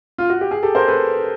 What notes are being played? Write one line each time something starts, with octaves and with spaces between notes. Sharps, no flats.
F4
F#4
G4
G#4
G4 A4
A#4 C5
A4 B4